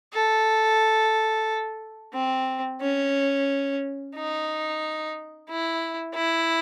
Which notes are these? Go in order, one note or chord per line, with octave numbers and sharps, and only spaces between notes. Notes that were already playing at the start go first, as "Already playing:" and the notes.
A4
C4
C#4
D#4
E4
E4